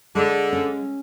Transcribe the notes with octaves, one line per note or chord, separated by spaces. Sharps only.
D3 G#3
C#4